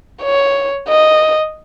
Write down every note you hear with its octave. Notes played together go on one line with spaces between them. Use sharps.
C#5
D#5